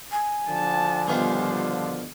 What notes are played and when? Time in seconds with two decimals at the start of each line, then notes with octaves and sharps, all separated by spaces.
0.11 G#5
0.47 D3 F3 A5
1.08 B2 D#3 G3 F4 C5